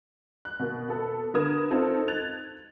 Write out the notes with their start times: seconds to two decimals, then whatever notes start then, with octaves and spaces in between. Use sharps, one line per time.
0.45 F#6
0.60 B2 A#3
0.88 B3 A4
1.34 D3 A#4 B4 D#6 G#6 E7
1.71 C4 D#4 F4 A4
2.08 F#6 G#6 A6 F7